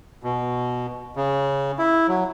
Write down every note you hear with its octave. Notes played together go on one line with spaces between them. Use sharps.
B2
C#3
E4
F#3